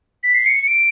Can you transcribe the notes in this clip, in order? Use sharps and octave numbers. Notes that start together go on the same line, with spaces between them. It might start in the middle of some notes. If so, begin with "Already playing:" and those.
B6
C7
C#7
C#7
D7